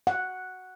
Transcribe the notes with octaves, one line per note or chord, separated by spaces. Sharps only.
F#5